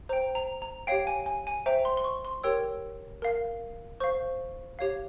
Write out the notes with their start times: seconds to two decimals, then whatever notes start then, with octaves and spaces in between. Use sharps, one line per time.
0.09 C5 A#5
0.13 G5
0.35 A#5
0.62 A#5
0.87 G4 C#5 F5 G5
1.07 G#5
1.26 G#5
1.47 G#5
1.66 C5 E5 G5 A#5
1.85 C6
1.97 C6
2.04 C#6
2.25 C6
2.43 G4 A#4 C#5 G5 E6
3.22 A#4 F5
4.00 C5 F5 C#6
4.79 G4 C#5 F5